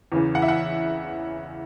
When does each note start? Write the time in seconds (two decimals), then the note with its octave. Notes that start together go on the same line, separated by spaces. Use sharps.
0.12 E2 C#3 E3
0.35 F#5
0.42 E5
0.48 F#5